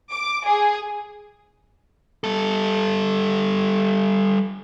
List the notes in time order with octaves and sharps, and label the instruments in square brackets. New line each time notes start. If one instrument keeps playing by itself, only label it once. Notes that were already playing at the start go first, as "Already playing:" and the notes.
[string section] D6
G#4
[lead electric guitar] G3 A4